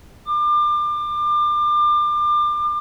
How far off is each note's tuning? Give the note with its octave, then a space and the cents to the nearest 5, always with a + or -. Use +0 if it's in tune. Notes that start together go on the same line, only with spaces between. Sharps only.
D6 +30